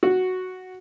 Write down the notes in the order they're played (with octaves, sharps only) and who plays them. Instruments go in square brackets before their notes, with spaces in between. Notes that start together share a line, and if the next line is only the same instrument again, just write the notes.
[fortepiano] F#4